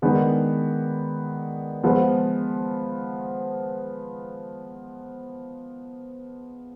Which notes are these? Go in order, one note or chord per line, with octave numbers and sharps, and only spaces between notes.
D#3 G#3 B3 D4
F3 G#3 B3